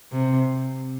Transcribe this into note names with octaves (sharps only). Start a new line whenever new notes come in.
C3